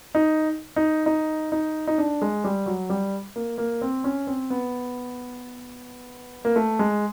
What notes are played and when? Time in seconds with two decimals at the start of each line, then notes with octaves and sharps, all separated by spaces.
0.15 D#4
0.76 D#4
1.06 D#4
1.52 D#4
1.87 D#4
1.98 D4
2.22 G#3
2.44 G3
2.66 F#3
2.90 G3
3.36 A#3
3.58 A#3
3.82 C4
4.04 C#4
4.27 C4
4.50 B3
6.45 A#3
6.56 A3
6.79 G#3